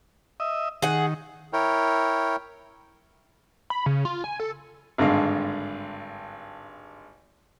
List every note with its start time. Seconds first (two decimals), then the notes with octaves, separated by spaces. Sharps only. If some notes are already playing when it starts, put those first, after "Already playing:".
0.40 D#5 E5
0.82 D#3 G#4 F#5
1.53 E4 A#4 C#5 G5
3.70 B5
3.86 C#3
4.05 F4
4.24 G#5
4.40 A4
4.98 G#1 G2 D3 G#3 F5